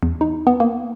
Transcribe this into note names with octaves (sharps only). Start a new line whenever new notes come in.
E2
D#4
B3
A#3